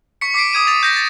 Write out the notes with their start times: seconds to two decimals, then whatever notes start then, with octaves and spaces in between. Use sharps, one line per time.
0.21 C#6 B6 C#7
0.34 D6 B6 C7 D7
0.53 D6 D#6 G#6 D#7
0.67 D#6 A6 F7
0.83 G6 A#6 B6
0.96 A6 A#6